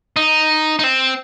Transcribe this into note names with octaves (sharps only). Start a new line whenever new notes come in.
D#4
D#4
C4